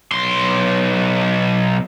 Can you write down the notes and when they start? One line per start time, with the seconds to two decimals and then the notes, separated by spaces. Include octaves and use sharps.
0.12 B1 C6